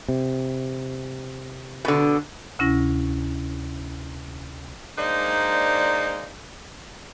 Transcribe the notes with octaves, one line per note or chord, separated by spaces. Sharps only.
C3
B2 D3
D2 C3 C#4 E4 A#6
G#3 A#3 D4 D#4 C5 D5